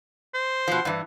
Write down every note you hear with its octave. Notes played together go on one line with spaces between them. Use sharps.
C5
B2 F3
G2 E3